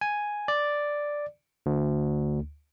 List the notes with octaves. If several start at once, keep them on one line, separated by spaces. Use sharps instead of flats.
G#5
D5
D2